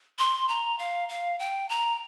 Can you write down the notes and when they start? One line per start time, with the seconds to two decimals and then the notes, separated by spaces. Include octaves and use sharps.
0.19 C6
0.49 A#5
0.79 F5
1.09 F5
1.39 G5
1.69 A#5